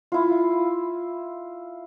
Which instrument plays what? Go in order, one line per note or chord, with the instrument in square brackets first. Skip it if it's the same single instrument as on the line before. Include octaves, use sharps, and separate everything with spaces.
[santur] E4 F4